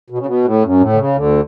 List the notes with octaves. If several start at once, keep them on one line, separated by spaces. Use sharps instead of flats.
B2
C#3
B2
A2
F#2
A2
D3
C#3
D2 D3